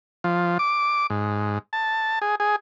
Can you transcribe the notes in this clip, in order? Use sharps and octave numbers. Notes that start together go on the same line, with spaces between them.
F3
D6
G#2
A5
G#4
G#4